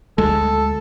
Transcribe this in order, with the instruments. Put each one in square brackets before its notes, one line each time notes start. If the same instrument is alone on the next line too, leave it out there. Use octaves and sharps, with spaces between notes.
[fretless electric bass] D2 G#3 [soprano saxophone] A4